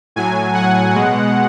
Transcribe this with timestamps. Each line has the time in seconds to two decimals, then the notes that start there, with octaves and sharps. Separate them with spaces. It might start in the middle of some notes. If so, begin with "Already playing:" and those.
0.16 A2 F#3 G#5
0.55 F#5
0.95 B2 G#3